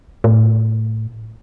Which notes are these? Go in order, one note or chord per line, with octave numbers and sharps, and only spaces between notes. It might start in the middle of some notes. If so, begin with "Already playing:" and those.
A2